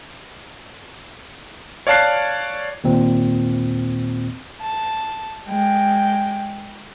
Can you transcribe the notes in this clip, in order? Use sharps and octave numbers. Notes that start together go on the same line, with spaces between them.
C#5 D5 F5 A5 F#6 C7
D#2 A#2 C4
A5
G#3 G5